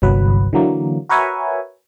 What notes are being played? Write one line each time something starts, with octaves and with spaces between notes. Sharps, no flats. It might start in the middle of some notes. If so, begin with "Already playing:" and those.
G1 C2 F#3 B4
D3 E3 F#3 A#3
F#4 A#4 B4 C#5 E5 G#5